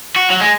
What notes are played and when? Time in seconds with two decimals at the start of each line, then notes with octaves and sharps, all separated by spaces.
0.16 F#4
0.30 F#3
0.41 G#3